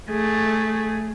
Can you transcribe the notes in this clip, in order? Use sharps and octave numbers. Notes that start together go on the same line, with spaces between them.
A3 G#4